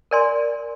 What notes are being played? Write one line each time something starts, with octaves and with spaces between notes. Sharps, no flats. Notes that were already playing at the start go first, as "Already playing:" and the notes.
A#4 D5 G#5 C6